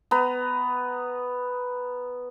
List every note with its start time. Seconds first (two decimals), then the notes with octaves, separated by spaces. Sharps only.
0.11 B3 A#5